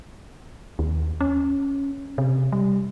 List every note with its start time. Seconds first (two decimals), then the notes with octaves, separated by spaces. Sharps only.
0.79 D#2
1.21 C#4
2.18 C3
2.52 G3